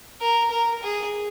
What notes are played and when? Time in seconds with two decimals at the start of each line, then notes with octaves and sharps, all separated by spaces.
0.21 A#4
0.51 A#4
0.83 G#4